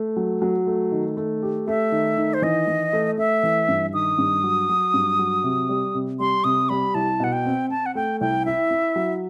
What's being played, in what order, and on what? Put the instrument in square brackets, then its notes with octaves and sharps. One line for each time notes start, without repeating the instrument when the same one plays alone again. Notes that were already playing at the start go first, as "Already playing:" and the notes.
Already playing: [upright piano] A3
F#3
F#3
A3
D#3
A3
G4
[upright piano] A3 [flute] E5
[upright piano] D#3
D#3
[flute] C5
[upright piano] E3 [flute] D#5
[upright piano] E3
A3
[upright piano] A3 [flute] E5
[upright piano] E3
G2
[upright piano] D#3 [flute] D#6
[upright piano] G2
F#3
F#3
G2
F#3
C3
G3
C3
[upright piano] G3 [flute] C6
[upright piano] C3 [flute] D#6
[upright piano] G3 [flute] B5
[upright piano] C2 [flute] A5
[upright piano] B2 [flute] F#5
[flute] G5
[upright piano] C4
[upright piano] C4 [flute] A5
[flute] F#5
[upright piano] A3 [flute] G5
[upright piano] C2 [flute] G5
[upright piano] E4 [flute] E5
[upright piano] E4
F#3